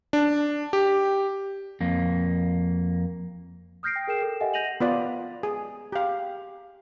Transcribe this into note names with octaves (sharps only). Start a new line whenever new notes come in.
D4
G4
F2 A#3
D#6 F6 G6 A#6 C7 D7
G5
G#4 A#4 G5 C7 E7
A4
G4 A4 D#5 E5 F#5 G#5
G6 A#6 D#7 F7 F#7
B3 F4 D5
G#4
G4 F5